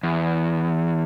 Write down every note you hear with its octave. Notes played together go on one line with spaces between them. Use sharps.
E2